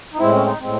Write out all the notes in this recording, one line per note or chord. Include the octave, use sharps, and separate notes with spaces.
D#4
A2 G#3 C4 E4
C#4
D#4
A2 G#3 C4